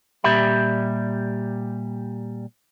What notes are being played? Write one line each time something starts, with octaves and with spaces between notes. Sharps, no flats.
A#2 G3 G4 E5 B5